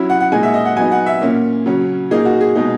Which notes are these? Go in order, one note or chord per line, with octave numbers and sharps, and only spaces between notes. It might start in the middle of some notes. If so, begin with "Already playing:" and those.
Already playing: F#3 C#4 E4
F#5
F#5
A#2 G#3 D#4 G#5
E5
D#5
F#5
F#3 B3 D#4 G#5
F#5
E5
A#2 A#3 C#4
C#3 F#3 C#4
A#2 A#3 D#4 G#4
F#4
G#4
B2 G#3 D#4